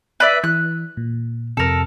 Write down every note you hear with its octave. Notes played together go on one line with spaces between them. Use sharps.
B4 D5 E5
E3 F#6
A#2
F2 C3 A4 A#4